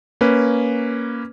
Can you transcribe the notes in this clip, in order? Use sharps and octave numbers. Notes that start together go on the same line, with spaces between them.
A#3 C#4 B4